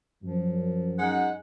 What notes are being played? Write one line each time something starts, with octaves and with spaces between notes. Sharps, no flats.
F#2 F3
G#3 D#4 F#5